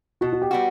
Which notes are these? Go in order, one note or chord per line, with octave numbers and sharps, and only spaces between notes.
B2 F#4
F#4
G4
G3 B3 F#4